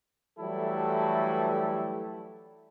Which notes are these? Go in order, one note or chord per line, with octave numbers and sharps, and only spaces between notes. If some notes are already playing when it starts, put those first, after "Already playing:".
E3 F#3 G3 A3 E4 A4